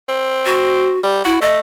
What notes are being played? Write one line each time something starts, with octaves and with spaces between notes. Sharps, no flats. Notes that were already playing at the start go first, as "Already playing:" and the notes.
C4
F#4
G3
E4 F#4
A3 D#5